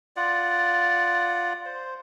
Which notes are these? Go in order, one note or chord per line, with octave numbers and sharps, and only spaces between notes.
F4 D5 F#5
C5